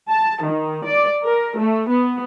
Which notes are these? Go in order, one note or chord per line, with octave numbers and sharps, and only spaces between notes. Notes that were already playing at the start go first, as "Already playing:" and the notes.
A5
D#3
D5
A#4
A3
B3